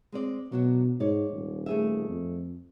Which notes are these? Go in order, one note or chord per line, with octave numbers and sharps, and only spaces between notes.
G#3 C4 D5
B2 F#3 D4 F#4
G#2 C#5 D5
D#1
A3 G#4 E5
F2